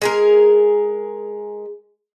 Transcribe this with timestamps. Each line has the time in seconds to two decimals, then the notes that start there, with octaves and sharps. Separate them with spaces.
0.02 G#3 G#4 A#4